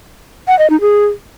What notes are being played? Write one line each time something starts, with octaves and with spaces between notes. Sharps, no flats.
F#5
D#5
D#4
G#4